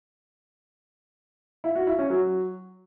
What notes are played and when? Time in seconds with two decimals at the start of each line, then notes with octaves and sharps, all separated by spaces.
1.64 E4
1.75 F#4
1.87 E4
1.99 C#4
2.10 F#3